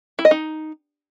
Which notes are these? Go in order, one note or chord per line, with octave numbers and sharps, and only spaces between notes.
E4
D#5
D#4